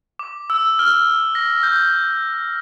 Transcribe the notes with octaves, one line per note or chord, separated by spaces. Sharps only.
D6
E6
F6
A#6
G6